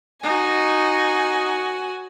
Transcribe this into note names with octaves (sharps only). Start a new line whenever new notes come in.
D#4 F#4 G#5